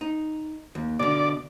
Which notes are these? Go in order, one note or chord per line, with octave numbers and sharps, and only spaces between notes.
D#4
D#2
B2 D3 D5